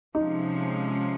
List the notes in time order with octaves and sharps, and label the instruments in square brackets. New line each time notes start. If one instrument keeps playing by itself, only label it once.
[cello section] C3 F3 G#3 C#4 [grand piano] D#4